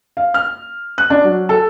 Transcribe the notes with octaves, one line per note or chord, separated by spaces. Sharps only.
F5
F6
F#6
D4
F#3
A4